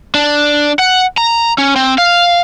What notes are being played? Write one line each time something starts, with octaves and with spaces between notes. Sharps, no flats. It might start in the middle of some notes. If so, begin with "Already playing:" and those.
D4
F#5
A#5
C#4
C4
F5